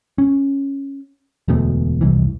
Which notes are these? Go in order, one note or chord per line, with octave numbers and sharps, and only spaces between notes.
C#4
E1 D2 A3 B3
F1 C2 E3